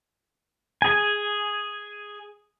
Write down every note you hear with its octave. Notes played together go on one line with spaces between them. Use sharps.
G#4 G#5